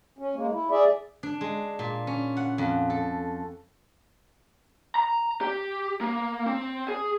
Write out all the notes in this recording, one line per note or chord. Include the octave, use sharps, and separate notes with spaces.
C#4
G#3 A#3
E4
G#4 D5 E5
D4
G#3
A#2
C#4
F#5
F2
A4
A#5
G4
A#3
C4
G#4